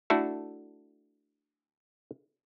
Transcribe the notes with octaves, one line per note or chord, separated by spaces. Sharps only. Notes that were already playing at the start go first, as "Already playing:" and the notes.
A3 D4 E4 F#4 A4